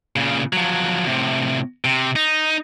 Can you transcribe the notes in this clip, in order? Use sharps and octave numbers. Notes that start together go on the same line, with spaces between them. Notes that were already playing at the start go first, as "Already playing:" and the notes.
A#2 C#3
F3 F#3
A2 C3
C3
D#4